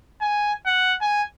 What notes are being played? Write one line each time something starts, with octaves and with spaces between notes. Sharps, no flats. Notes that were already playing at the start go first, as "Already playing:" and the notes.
G#5
F#5
G#5